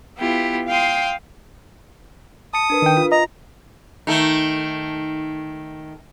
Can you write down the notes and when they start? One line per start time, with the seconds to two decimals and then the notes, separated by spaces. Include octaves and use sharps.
0.18 B3 E4 F4 G4
0.68 F5 G5 C6 D#6
2.54 A5 D#6 C#7
2.70 D4 A#4 B4
2.82 D#3 G5
2.97 F4
3.12 D#5 A#5
4.07 D#3 A3